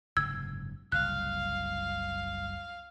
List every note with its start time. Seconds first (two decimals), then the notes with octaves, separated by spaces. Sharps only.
0.17 F#1 G#2 C3 E6 G#6
0.92 F#1 C2 F5 F#6